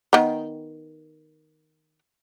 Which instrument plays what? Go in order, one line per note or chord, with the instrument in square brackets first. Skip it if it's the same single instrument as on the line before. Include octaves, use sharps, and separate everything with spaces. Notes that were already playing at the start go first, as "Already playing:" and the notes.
[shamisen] D#3 B3